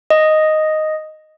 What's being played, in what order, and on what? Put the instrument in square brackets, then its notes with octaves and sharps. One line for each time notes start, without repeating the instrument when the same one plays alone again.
[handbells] D#5